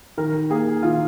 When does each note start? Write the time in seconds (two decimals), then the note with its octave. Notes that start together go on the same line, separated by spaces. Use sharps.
0.18 D#3 A#4
0.50 A#3 G#4
0.83 D#3 F4